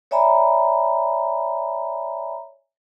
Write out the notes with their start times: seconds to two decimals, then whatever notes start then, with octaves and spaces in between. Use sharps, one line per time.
0.11 C#5 D5 E5 G#5 A#5 B5